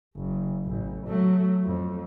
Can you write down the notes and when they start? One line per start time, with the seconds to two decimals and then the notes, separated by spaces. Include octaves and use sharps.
0.16 F#1
0.65 A1
1.07 F#3 A3
1.64 F2